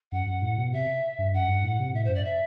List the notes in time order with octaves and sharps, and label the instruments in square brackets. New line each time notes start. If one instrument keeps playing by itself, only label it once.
[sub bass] F#2 [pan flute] F#5
[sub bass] F#2
A2
B2
[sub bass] C3 [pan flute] E5
[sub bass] G2
[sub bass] F#2 [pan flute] F#5
[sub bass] G2
A2
C3
[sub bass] A2 [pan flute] E5
[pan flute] C5
[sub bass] F#2
[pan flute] D5
E5